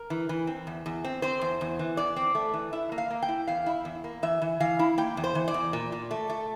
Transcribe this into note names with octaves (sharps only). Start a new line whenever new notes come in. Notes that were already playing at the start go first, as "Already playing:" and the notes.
Already playing: A#4
E3
E3
C4
E2
E2
C4
C4 C5
E2
E2
E3
E2 D5
C4
A3
E3
E4 E5
A#3
F5
A#3
G5
E4
E2 F5
E4
E2
A#3
E3 E5
E3
E3 F5
E4
A#3 G5
E2
C5
E3
D5
E2
A#2
A#2
A3
A3